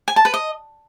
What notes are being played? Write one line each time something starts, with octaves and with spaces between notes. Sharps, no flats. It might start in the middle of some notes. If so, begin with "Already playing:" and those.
G#5
A5
B4
D#5